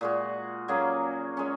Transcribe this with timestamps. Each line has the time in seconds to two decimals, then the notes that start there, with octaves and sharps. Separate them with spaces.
0.01 A#2 G#3 F#4
0.68 F#3 A#3 C#4 G#4
1.37 G#3 C#4